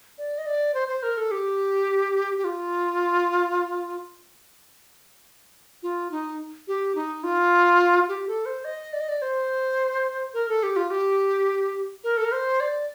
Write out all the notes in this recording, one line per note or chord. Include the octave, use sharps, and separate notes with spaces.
D5
D#5
D5
C5
C5
A#4
A4
G4
G4
F4
F4
D#4
G4
D#4
F4
G4
A4
C5
D#5
D5
D#5
D5
C5
A#4
A4
G4
F4
G4
A#4
A4
A#4
C5
D5